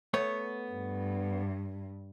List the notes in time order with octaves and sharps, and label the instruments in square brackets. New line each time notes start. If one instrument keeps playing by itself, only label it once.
[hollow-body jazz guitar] A3 B3 C#5
[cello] G2